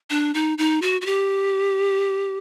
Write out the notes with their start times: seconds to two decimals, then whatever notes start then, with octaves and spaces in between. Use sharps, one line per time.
0.10 D4
0.34 D#4
0.58 D#4
0.82 F#4
1.01 F#4
1.06 G4